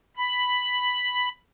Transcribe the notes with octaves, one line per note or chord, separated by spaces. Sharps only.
B5